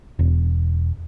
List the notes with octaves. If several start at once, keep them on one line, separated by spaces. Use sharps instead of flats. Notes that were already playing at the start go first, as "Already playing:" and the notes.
E1